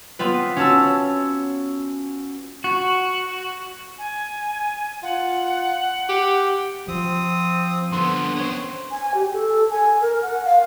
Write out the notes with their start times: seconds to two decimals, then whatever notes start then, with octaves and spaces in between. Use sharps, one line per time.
0.19 B3 C4 F4 B4
0.56 C#4 F#4 A5 E6
2.64 F#4
3.98 G#5
5.03 F4 F#5
6.09 G4
6.88 F3 C4 D#6
7.92 D3 B3 C6
8.36 B3 C5 C#5
8.91 G#5
9.15 G4
9.33 A4
9.71 G#5
10.02 A#4
10.22 F#5
10.45 F5